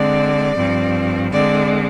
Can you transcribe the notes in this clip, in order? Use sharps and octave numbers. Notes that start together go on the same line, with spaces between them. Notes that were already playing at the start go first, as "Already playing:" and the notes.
Already playing: D3 G#3 C4 D5
G2 F3 C4
D3 G#3 C4 D5